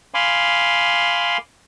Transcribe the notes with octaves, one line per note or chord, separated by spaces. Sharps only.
F5 G#5 B5 C6 D6